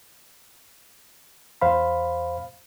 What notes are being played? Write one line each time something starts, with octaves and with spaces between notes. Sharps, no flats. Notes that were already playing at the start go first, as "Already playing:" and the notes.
E2 C5 F5 B5